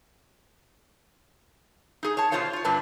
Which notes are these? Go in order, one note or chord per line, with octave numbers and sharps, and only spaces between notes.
D#4 G#4
C#5 A5
B2 G3 F4 C5 C#5 F5
F4 C#5
G2 D3 D4 B4 A5